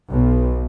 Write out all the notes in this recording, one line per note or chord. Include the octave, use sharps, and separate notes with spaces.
B1